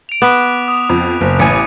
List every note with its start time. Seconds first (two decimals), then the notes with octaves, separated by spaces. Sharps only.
0.09 D7 F7
0.22 B3 D6 F#6 B6
0.68 D#6
0.89 F2
1.21 F#1
1.39 A1 G#5 C#7 D#7